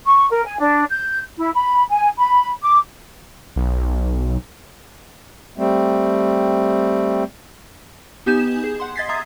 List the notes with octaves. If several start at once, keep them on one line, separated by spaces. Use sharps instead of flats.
C#6
A#4
G#5
D4
G6
E4
B5
G#5
B5
D6
B1
G3 A3 C4
B3 D#4 G4 G#5 G6 E7
G#4
F#5 C6
D#5 G#6 A6 B6 C7
E5 A#5 D#6